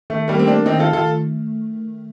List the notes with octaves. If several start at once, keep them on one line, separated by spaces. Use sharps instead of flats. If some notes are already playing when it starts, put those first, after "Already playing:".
D#3 A3
G3 A#3
A3 C4
A#3 D4
D#3 C4 D#4
F4 A4
D#3 F4 A4